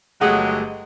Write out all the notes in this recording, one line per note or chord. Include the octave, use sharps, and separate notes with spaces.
G1 F#3 G#3 A3 G4 G#4 F#5